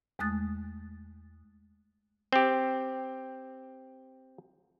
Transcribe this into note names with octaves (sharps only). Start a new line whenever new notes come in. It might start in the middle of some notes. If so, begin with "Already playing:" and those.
E2 G#3 A3 D#6 F#6 A6
C4 G4